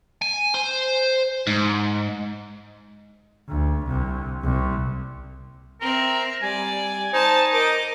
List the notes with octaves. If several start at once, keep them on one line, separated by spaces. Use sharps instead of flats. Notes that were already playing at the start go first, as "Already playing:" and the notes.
G#5
C5
G#2
D2
C2
C2
C4 A#4 E5
G3 D5 G#5
D#4 C5 A5
A#4 D#5 D6